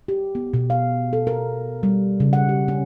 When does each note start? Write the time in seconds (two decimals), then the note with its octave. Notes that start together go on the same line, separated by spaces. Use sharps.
0.08 G4
0.35 B3
0.54 B2
0.70 F5
1.13 A4
1.27 A#4
1.83 G3
2.20 C#3
2.33 F#5
2.49 G4
2.68 C#4